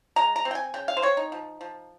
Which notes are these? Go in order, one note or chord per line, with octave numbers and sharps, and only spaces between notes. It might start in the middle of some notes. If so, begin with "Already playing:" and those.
G#3 A#5
A#5
C4
G5
G#5
C#3 G5
F5
C5
C4 C#5
D#4
F3
F3